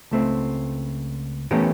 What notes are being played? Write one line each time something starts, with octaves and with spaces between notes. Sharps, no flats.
C#2 A3 C4
E3 A3 B3 C#4 G4 A#4